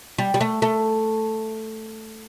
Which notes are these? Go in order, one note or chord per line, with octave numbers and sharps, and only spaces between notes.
G3
G3
A3
A3